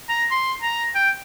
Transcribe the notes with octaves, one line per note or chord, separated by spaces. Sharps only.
A#5
C6
A#5
G5